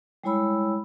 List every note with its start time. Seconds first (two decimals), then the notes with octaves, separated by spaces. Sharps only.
0.24 G3 G#3 E4 C#5 B5 E6